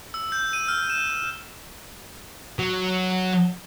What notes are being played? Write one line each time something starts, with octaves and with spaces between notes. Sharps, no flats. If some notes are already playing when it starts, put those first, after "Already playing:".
E6
G6
D#7
F6
E7
F#3